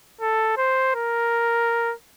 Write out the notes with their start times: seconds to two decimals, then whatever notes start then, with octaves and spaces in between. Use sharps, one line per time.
0.21 A4
0.57 C5
0.95 A#4